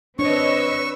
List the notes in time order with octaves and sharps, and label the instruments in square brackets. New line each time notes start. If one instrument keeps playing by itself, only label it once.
[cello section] C4 C#5 D#5 [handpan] D4 [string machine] B4 E6 [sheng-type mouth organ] C#6